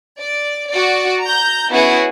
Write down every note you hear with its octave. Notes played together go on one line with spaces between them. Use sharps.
D5
F#4 D5
A#5 G6
B3 C#4 E4 F#4 G#4